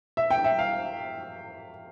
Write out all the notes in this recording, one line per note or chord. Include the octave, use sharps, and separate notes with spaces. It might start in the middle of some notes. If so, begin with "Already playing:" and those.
E5
G5
E5
F5